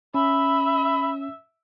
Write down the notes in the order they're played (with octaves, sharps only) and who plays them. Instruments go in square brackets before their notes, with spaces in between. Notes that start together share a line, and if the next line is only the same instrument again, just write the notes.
[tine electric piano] C#4 [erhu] E5 [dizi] B5